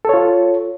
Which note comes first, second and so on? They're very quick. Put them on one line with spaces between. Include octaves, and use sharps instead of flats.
A4 C#5 F4